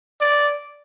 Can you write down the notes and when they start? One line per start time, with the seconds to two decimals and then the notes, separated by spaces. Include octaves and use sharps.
0.21 D5